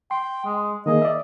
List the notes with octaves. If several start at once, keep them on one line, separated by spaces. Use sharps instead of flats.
G5 C6
G#3
D#3 A#3 G#4 D#5
D5 E5